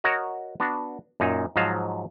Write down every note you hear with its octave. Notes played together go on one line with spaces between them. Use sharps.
F#4 A#4 C#5 D#5
B3 D4 F#4
F#2 A#2 D#4 G#5
G#2 F3 F#3 D#5 F5 A5